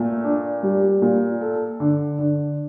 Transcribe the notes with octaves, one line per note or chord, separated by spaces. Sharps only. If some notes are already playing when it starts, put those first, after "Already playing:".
Already playing: A#2 A3
D4
G3
A#2
A4
D3
D3